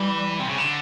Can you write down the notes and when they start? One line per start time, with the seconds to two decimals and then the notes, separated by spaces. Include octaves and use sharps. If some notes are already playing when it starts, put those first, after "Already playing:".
Already playing: E3 G3
0.39 C3
0.49 C#3
0.58 D3